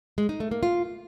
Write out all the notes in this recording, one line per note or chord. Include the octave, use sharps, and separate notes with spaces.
G#3
D#4
A3
A#3
F4